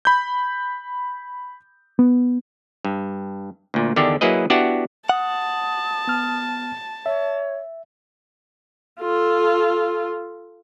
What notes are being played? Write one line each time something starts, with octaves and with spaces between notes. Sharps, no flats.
B5 G6
B3
G2
D2 A#2
E2 D3 D#3 D4 G4
F#3 A#3 E4 G#4 B4 D#5
B3 D4 E4 F#4 G4 F#5
F#5 A5 D#6
B3 F6
C#5 E5
F4 A4